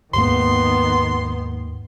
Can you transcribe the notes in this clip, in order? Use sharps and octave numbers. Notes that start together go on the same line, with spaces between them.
D#2 G#2 D#3 A#3 B3 C6